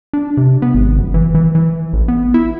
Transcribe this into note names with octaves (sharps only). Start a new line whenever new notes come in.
D4
C3
B3
G#1
F#1
E3
E3
E3
A1
B3
E4